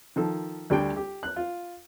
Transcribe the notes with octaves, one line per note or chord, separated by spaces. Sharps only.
D#3 F3 A4
D2 G3 D4 G5
G4
F#6
F4